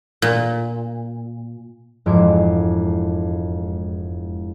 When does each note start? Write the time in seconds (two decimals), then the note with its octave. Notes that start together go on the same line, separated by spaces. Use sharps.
0.22 A#2
2.06 E1 F2 G#2 G#5 D6